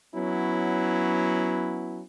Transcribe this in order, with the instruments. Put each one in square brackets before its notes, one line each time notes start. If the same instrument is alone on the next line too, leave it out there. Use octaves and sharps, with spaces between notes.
[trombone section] F#3 B3 C#4 E4